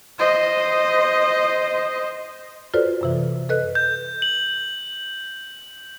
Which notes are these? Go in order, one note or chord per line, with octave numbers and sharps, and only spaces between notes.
C5 D#5
F4 F#4 A4 B4 C5 D5
F#2 C3 E3
A4 B4 D#5 F#6
G6
F#7